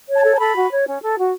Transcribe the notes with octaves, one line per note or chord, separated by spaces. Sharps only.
C#5
A5
A4
A5
A4 B5
F#4
C#5
C#4
A4
F#4